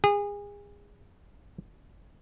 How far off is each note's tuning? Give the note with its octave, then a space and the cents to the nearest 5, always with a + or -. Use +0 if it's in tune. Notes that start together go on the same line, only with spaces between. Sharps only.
G#4 -30